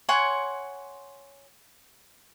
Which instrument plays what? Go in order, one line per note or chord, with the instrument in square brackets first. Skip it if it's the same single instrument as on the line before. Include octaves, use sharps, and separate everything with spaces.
[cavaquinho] C#5 F#5 G#5 C6